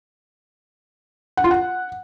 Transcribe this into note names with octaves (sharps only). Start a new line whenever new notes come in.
F#5
F4
F#5